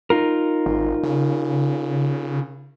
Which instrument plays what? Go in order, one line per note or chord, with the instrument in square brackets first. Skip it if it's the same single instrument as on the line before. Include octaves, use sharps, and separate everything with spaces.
[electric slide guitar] D#4 F4 A#4
[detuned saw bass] G#1
C#3